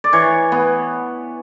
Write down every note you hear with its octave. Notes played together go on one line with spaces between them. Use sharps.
D5
E3 C#5
B3